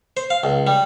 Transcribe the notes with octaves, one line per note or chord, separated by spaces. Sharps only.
C5
F5
C#2
G3